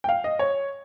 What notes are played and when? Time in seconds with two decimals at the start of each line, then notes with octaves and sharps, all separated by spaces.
0.04 G5
0.09 F5
0.24 D#5
0.39 C#5